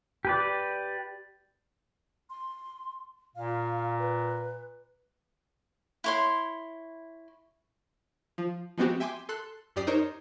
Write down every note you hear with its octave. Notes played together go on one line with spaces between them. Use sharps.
G4 B4 D5
C6
A#2 F5
B4
E4 C#5 C6
F3
F3 G#3 B3 C4 F#4 G4
E5 G5 G#5 C6 D6
A4 C6 F#6
F#2 G4 D5 D#6 C7
D#4 A#4 C5 C#5